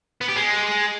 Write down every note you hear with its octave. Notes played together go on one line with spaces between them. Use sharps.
B3
G4
G#3